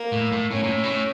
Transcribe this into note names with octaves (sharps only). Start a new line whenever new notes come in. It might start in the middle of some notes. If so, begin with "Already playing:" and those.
Already playing: A#3
A2
A2
A2 C#4
A#2
A2
A#2
A2